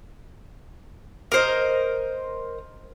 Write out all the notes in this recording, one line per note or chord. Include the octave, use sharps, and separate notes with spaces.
A#4 C5 D#5